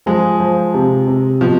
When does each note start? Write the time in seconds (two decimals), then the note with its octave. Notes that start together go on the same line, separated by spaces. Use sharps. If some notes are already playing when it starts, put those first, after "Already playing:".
0.06 F3 G#3
0.40 F3
0.74 C3
1.07 C3
1.41 B2 F3